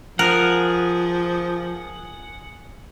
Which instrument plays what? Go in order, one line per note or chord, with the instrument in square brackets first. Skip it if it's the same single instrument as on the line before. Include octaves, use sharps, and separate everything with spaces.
[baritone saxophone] F3 [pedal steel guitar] G#4 F#5 [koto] A#4